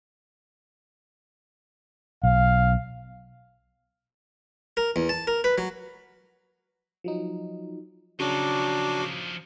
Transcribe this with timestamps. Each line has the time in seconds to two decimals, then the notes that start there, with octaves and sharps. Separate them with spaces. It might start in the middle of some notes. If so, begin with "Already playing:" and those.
2.23 B1 F5
4.77 A#4
4.96 E2
5.09 A5
5.27 A#4
5.44 B4
5.58 F#3
7.04 F3 F#3 D#4
8.20 C#3 F3 F#3 D4 D#4 F#4 D6